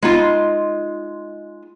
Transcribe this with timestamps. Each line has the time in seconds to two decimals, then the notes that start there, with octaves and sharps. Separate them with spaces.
0.02 G#3 D#4 F4